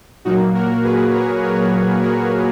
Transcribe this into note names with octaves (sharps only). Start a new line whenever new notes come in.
A#2 F#3 A#3 D#4 F#4
F#4 A#4
G#4 B4
A#4 C#5
A#4 C#5
F#4 A#4